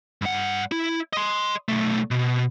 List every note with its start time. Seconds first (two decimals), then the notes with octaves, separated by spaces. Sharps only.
0.22 G2 F#5
0.72 E4
1.13 D#5 C6
1.69 B1 A3
2.11 B2